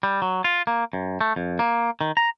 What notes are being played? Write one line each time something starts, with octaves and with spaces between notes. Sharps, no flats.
G3
F#3
F4
A#3
F#2
A3
F2
A#3
D#3
A#5